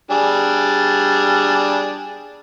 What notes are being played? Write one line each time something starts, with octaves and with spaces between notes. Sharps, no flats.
G3 D4 G#4